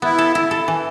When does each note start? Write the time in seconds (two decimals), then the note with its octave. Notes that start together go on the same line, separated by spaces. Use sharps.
0.02 B3 E4
0.18 A4
0.35 E4
0.51 A4
0.68 E3